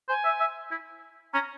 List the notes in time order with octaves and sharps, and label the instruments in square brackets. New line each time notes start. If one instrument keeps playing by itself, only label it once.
[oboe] C5 [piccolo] G#5
[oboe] E5
E5
E4
[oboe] C#4 [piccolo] A#5